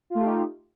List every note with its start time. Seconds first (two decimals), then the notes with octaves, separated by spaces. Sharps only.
0.10 F4
0.15 A3
0.20 G4
0.25 D#4